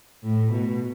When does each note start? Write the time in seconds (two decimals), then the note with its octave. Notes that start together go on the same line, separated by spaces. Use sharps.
0.23 A2
0.51 B2